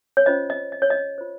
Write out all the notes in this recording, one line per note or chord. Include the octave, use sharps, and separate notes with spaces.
C#5
C#4 F4 C5 D#5
D#5
D#5
C#5
D#5
F4 C5